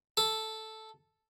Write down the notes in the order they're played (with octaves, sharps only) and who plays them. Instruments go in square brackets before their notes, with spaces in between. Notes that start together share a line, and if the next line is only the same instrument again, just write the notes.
[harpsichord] A4